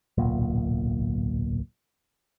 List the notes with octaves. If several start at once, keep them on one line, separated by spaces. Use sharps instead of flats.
D1 B1 A#2